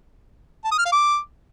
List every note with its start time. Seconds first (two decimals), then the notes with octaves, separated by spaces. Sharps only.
0.65 A5
0.72 D#6
0.79 F6
0.85 F5
0.92 D6